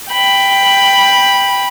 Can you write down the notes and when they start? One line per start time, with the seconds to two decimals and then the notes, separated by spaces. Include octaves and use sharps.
0.10 G5 B5